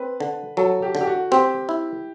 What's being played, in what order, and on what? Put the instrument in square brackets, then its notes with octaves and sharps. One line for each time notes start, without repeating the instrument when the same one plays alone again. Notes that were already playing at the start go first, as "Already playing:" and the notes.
Already playing: [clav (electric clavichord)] C4 [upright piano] B4
[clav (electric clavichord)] D3
[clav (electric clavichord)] F#3 [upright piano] A4
[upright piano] G4
[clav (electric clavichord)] D3
[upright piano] G4
F#4
[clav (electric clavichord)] C4 [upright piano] G4
[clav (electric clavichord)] E4